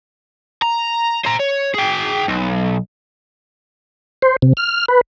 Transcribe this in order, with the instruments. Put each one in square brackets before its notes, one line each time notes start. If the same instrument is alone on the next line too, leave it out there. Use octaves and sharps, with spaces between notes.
[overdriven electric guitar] A#5
C5 A#5
C#5
G#4 G5
B1
[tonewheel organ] C5
C3
F6
B4